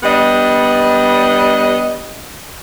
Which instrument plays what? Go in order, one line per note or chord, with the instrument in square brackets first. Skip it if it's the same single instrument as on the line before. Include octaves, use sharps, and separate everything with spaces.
[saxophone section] G3 B3 D4 D#5